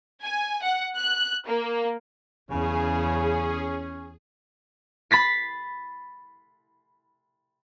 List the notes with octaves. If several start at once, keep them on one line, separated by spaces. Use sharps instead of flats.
G#5
F#5
F#6
A#3
E2 C#3 C#4 G#4
B5 A6 B6 C7